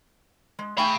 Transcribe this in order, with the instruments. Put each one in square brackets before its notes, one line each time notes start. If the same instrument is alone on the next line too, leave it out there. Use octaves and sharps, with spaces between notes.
[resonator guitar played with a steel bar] G#3
[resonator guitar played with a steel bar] A3 G5 G#5 [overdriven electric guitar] F5 B5